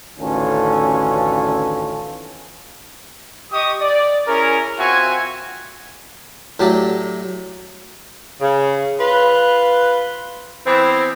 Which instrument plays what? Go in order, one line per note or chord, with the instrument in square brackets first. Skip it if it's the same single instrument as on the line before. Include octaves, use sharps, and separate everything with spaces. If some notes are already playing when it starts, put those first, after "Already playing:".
[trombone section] A1 D2 D#3 C#4 F4 A4
[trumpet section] G4 D#5 C#6 D#6
D5
C#4 E4 G#4 A#4
C4 F4 F#4 E5 G#5 C#6
[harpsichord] A2 F#3 G4 D5
[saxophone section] C#3
F4 B4
E3 B3 C4